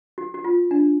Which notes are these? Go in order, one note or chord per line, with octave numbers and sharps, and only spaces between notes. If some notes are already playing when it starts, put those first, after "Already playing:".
F#4
F#4
F4
D4